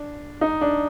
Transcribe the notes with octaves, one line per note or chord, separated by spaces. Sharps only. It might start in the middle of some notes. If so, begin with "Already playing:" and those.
Already playing: D4
D#4
D4